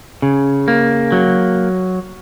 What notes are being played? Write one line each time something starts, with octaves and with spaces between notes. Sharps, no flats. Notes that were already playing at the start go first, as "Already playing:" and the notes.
C#3
A#3
F#3